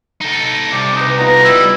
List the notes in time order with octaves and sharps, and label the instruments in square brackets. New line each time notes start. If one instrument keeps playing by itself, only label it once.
[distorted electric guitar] D#4 A4
[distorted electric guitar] C2 C3 [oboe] D5
[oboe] D#4 [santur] B4 A5
[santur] B3 D#4 F4 [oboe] A#5
[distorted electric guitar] G3 [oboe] E4